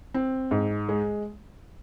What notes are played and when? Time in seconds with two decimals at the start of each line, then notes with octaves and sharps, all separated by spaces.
0.14 C4
0.51 G#2
0.89 G#3